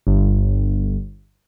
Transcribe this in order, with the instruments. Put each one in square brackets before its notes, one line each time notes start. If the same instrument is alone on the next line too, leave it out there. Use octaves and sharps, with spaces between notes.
[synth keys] G1